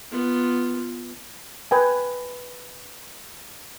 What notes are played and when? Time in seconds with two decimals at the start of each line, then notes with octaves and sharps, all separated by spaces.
0.11 B3 F4
1.71 B4 G5 G#5